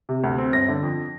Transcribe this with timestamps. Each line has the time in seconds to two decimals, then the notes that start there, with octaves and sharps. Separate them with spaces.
0.09 C3
0.24 D2
0.38 C4
0.53 G1 A#6
0.68 D3
0.83 F2